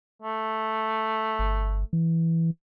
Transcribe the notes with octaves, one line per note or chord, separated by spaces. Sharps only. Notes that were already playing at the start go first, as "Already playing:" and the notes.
A3
G1
E3